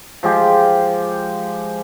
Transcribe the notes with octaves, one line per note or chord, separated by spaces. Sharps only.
F3 G#3 G4 G5